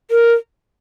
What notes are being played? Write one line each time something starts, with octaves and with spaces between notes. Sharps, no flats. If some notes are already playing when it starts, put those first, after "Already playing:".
A#4